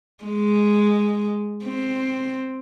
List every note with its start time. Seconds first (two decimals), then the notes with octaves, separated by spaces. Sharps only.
0.24 G#3
1.64 C4